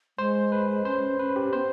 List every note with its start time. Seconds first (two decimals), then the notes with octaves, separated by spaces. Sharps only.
0.18 G#3 C5
0.52 B4
0.85 C#4 C5
1.19 C#4 B4
1.36 G4
1.53 B3 C5